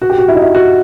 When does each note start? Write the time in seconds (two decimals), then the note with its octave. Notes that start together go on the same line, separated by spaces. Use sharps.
0.02 F#4
0.10 G4
0.18 F#4
0.28 E4
0.35 D#4
0.43 E4
0.55 F#4